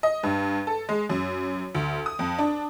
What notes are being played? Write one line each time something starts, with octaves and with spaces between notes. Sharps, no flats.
D#5
G2
A4
G#3
F#2
D2
D#6
F2
D4